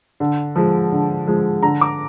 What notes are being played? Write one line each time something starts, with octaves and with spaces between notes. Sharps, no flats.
D3
F3 G#3
D3
F3 G#3
D3 A#5
D6